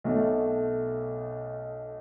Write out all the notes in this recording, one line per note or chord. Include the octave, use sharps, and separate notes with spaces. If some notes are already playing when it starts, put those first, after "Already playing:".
B1 B2 A3